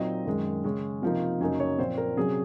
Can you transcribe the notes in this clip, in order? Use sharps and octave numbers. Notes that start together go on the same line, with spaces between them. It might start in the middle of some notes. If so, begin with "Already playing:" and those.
Already playing: A#2 F#3 C4 D#4 D#5
F#2 D#3 G#3
C#3 G#3 C#4
C3 F3 A#3 D#4 F5
F#2 C#3 F#3 A#3 D#4 G#5
C#5
A#2 F3 C4 C5
A#4
C3 F#3 C#4 G#4